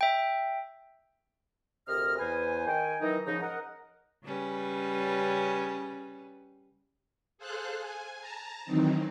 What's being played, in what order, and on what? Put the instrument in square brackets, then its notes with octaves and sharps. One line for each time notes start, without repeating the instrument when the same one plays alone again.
[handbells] E5 G5
[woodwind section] D2 C3 A#4 D#5 F6
E2 B4 C5 G#5
D#3 G5 G#5
D#3 E3 F#3 D#4
G#2 C#3 F3 D#4
A#4 D#5 F#5
[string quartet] C#3 G3 C#4 B4
[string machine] G#4 A4 C5 F5 F#6
G#5
A5 A#5
D#3 E3 F#3 C4 D#4